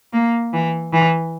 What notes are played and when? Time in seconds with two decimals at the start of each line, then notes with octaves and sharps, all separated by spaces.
0.13 A#3
0.54 E3
0.93 E3